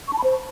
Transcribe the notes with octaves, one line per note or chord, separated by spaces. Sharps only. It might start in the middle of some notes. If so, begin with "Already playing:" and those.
C#6
A5
B5
C5